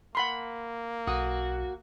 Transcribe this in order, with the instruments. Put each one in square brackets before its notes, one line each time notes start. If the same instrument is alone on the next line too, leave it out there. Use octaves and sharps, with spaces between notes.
[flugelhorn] A#3 [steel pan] F#5 B5 C6
[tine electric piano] B1 [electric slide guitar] F#4 [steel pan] D#6